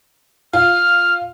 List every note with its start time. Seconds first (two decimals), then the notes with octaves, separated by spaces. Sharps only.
0.53 F4 F6